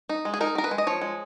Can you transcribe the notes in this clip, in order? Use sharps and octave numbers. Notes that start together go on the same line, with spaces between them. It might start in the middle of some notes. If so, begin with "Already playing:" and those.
D#4
G#3
G#4
D#4 A#4
D#3 A#4
B4
G#3
D#5
F3 C#5
G#3